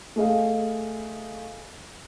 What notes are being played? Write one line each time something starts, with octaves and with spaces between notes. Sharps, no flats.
A3 G#4 D#5 F5